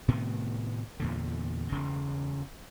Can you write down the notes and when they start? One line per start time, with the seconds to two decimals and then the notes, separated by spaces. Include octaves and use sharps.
0.08 A2 C3 D#3 B3
1.00 E2 A#2 D3
1.72 E1 C#3